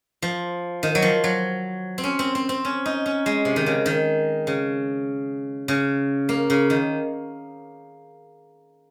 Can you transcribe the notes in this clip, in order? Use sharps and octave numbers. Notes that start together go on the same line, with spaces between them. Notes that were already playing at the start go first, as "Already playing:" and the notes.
F3
D#3
F#3
F3
F#3
C4
C#4
C4
C4
C4
C#4
D#4
C#4
G#3
C3
D#3
C#3
D#3
C#3
C#3
A#3
C#3
D#3